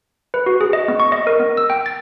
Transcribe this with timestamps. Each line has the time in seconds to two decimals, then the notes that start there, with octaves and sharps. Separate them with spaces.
0.34 B4
0.46 F#4
0.61 G#4
0.73 D#5
0.88 B3
1.00 C#6
1.12 D#5
1.27 A#4
1.40 B3
1.57 E6
1.70 G5
1.86 A6